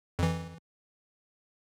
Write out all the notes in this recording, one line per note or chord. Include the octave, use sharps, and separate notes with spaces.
F2 E3